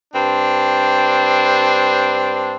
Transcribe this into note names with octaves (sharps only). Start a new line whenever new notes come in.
G2 C4 D4